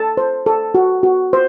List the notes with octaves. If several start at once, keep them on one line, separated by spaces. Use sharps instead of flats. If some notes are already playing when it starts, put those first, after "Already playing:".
Already playing: A4 A5
C5
A4
F#4
F#4
C5